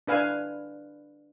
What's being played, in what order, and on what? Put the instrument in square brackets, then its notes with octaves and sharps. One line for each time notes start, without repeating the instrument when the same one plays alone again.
[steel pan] D4 B4 F5 G#5